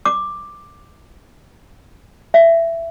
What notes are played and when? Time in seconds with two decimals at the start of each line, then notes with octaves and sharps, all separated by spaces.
0.06 D6
2.34 E5